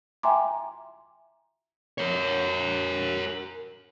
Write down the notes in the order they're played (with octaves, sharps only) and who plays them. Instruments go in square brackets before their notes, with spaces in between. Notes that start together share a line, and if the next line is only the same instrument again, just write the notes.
[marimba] E5 G5 G#5 A#5 C6 D6
[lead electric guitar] A#4 C#5